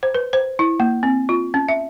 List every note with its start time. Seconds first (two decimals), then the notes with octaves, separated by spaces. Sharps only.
0.03 C5
0.15 B4
0.33 C5
0.59 E4
0.80 A#3
1.03 C4
1.29 F4
1.54 C#4
1.68 E5